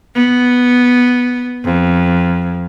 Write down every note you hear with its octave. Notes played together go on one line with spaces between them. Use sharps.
B3
F2